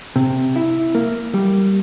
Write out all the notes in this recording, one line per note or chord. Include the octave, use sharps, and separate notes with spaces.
C3
E4
A#3
G3